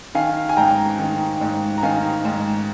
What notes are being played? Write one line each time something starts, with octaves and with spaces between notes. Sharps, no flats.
D#3 F5 G#5
G#5
G#2 G5 A#5
D#3
G#2
A#5
D#3 F5 G#5
G#2